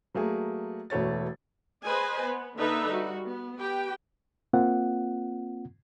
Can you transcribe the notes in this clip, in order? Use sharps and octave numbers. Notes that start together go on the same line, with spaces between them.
F#3 A3 A#3 G#4
E1 B2 A3 C#5 A6
G#4 B4 C5 D#5 G#5
B3
D3 A#3 D#4 A4 B4 E5
G3 F#4
B3
G4 B4 G5
A#3 C4 F4 F#5